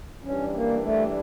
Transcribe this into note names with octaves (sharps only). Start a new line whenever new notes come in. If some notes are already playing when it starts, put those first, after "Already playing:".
E3 G3 C#4 D4 G4
A#3
A3